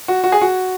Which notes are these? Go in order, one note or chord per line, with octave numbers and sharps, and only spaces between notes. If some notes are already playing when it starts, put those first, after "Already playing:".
F#4
F#4
G#4
F#4